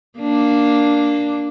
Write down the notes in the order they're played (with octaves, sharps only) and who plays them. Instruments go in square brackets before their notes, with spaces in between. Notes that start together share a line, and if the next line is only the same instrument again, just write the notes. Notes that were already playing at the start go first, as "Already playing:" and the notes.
[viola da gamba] A#3 D4